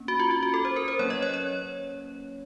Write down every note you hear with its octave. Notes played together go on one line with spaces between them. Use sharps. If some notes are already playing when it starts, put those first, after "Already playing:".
Already playing: A#3 C#4
F#4
F4
F4
F#4
A4
C5
A#4
C5
F#3 A#3 C#4 C#5
D#5
C#5
C#5